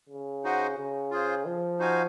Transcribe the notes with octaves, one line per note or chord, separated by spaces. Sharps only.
C#3
D#4 F#4 C5 D#5 F#5
C#3
F4 G#4 C5
F3
D#4 F#4 C5 F5 G#5